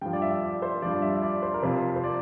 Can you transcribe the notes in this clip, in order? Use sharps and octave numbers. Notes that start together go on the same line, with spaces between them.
G2 F3 G5
D5
E5
D5
C5
G2 F3 D5
E5
E5
D5
C5
A#4
F2 C3 F3 C5
C5
D5